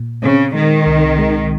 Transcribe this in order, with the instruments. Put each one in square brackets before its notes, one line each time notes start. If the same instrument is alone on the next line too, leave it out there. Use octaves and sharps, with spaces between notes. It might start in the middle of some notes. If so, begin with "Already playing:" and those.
Already playing: [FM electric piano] A#2
[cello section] C#3 [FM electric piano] C4
[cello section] D#3 [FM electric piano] G#3
[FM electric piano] C2
G#3